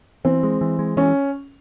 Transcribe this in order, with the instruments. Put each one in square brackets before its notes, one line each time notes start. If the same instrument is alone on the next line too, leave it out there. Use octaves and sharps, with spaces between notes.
[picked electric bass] E3 [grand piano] C4
[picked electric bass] G#3
E3
G#3
[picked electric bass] E3 [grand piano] C#4